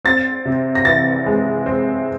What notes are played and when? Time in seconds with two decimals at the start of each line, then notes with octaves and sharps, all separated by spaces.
0.05 C4 A6
0.45 C3
0.75 A#6
0.85 E3 A6
1.26 G#3
1.66 C4